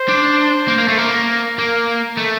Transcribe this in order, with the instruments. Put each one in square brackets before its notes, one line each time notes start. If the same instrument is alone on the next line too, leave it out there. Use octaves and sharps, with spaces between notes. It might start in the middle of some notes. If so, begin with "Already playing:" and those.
Already playing: [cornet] C5
[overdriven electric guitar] D4
A#3
A#3
A3
[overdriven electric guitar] A#3 [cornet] A#4
[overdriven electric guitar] A#3
A3